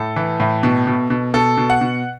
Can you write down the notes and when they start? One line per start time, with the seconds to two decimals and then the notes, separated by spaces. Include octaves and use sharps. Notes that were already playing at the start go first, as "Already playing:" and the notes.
Already playing: A2 A4
0.16 E3
0.40 A2
0.63 B2
0.87 B2
1.10 B2
1.34 B2 A4
1.57 B2
1.70 F#5
1.81 B2